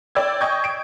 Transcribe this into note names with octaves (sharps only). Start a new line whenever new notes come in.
C#5 D5 G5 E6 G#6
D#5 G5 G#5 C#6 G6 G#6
D7